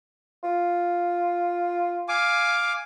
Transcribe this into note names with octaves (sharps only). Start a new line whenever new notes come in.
F4
F5 G#5 D6